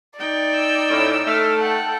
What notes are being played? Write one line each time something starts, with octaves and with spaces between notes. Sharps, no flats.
D#4 D5 G5
E6
A2 C#4
A3 F6
A4 F#5 G5